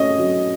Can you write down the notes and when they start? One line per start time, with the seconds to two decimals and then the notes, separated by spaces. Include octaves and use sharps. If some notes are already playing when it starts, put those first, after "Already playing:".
Already playing: A3 C#4 F#4 D#5
0.18 F#3